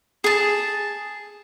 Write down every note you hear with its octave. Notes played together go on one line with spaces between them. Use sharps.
G#4 A5